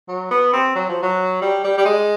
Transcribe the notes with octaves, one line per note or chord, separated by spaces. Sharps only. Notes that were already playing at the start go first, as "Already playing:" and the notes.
F#3
B3
C4
F#3
F3
F#3
G3
G3
G3
G#3